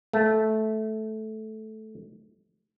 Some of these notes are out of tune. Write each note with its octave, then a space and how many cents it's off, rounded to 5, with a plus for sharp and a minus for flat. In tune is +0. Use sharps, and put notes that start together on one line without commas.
A3 -10